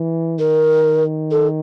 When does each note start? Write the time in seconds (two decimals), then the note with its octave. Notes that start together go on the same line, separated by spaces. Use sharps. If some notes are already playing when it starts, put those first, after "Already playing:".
Already playing: E3
0.39 D#3 A#4
1.31 A4